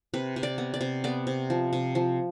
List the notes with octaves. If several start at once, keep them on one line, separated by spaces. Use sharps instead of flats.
C3 B4
C3
D5
B3
D5
C3
B3 D5
C3
F3
C3
F3